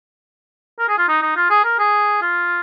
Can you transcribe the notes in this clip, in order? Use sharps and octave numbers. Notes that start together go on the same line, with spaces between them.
A#4
G#4
F4
D#4
D#4
F4
G#4
A#4
G#4
F4